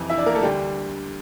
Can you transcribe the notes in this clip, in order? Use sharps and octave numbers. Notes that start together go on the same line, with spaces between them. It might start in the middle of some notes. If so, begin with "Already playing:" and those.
Already playing: F2 C3 E3
E4 E5
D4 D5
A#3 A#4
A3 A4
D2 D3 G3 G4